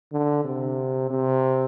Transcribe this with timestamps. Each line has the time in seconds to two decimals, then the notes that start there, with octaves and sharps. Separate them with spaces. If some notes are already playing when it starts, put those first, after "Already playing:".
0.12 D3
0.44 C3
1.10 C3